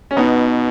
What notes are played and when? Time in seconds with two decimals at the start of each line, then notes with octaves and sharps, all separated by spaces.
0.11 C#4
0.17 B2 B3 D#4